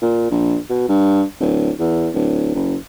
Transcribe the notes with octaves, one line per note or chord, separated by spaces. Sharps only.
A#2
A#1
B2
G2
D1
E2
D1
F#1